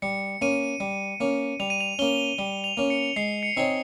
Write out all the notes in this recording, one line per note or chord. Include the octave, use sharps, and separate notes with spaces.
G3 C#7
A#3 C#4 D#7
G3
A#3 C#4
G3 F7
D#7
F7
A#3 C#4 G7
G3 G7
F7
A#3 C#4
C#7
G#3 C7
C#7
C4 D#4 G#4 C#5